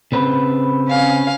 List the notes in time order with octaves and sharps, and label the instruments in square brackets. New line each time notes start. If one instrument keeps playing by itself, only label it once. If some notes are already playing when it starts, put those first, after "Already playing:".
[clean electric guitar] C#3 C4 B4
[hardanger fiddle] C#4 F5